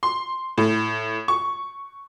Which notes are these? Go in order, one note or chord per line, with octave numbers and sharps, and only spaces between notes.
C6
A2
C#6